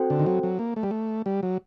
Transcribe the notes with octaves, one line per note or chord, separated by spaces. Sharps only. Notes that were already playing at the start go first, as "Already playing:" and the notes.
Already playing: C4 F#4 A4 C5 G5
D3
D#3
F#3
F#3
A#3
A3
G3
A3
G3
F#3